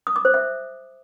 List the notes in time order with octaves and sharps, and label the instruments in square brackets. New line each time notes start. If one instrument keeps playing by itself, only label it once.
[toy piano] D#6
D6
C5
E5